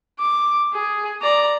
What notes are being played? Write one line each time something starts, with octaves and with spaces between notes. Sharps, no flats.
D6
G#4
D5 A#5